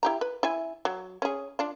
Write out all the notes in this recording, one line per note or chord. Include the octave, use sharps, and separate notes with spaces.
E4 G4 A#5
B4
E4 E5 G#5
F#3
C#4 G#4
D4 F4